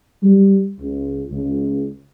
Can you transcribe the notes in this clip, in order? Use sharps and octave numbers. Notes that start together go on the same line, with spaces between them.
G3
C#2
C#2